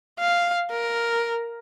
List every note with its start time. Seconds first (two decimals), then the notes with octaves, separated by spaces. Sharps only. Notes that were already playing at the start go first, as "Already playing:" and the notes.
0.20 F5
0.71 A#4